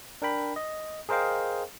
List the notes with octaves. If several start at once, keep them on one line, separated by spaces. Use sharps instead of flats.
D4 A#4 G5 B5
D#5
G#4 A#4 C5 D#5 F5 G5